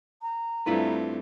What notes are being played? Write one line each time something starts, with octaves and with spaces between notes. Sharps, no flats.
A#5
G2 A3 C4 E4 F4 B4